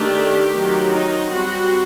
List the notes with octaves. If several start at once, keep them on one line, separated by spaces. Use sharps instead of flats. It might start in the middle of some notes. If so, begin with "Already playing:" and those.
Already playing: D#3 A3 D4 G4
D#3 F#3 C4
D#4
G3 C4 F#4